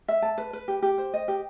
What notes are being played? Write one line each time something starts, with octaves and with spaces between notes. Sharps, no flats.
E5
A5
B4
B4
G4
G4
C5
D#5
G4